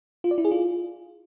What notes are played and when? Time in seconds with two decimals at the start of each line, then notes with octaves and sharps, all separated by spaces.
0.24 F4
0.31 D5
0.38 E4
0.45 G#4
0.51 F4